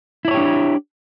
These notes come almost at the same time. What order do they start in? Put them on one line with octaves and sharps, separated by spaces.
E4 D5 C#5 G4 D4